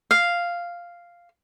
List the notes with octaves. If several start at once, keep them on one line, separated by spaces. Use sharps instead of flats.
F5